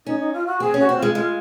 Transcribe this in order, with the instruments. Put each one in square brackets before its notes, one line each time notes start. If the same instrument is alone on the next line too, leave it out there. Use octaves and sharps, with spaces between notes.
[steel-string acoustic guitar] C#4 [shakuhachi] D#4
[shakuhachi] D#4
F4
F#4
[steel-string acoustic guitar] C4 [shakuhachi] G#4
[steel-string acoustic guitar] C#4
[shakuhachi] F#4
[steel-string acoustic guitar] C4
[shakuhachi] F4
[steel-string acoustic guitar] G#3
[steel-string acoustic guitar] G#3 [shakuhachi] F4